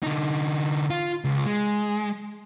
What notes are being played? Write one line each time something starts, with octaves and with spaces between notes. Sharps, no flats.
D3 D#4
F4
C#2
G#3